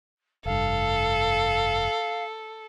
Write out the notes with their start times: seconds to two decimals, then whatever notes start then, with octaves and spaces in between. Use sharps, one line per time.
0.46 F1 G2 A4 F5